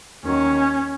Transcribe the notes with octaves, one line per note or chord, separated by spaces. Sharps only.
D#2 D#3 F#3 C#4